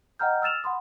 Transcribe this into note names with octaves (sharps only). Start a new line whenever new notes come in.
D#5 F#5 G5 A#5 F6 G6
E6 F6 A6 E7 F7
F#5 B5 C6 D#6